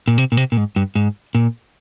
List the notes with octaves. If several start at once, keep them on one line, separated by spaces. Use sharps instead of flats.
A#2
C3
A#2
C3
A#2
G#2
G2
G#2
A#2